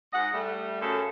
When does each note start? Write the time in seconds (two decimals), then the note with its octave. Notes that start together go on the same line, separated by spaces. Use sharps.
0.13 G#2 D#5 F#5
0.33 G3 A3
0.81 F#2 C#3 A4